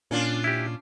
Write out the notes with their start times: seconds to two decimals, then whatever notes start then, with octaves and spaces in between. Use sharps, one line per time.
0.11 A#2 C#4 D4 F4
0.44 E4 G4